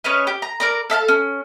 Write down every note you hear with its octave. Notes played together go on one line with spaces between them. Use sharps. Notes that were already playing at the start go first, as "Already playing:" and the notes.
C#4 B4 C#5 D#5
G4
A#5
A#4 D5 A#5
A4 E5 F5 A5
C#4